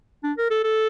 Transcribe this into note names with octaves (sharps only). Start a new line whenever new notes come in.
D4
A#4
A4
A4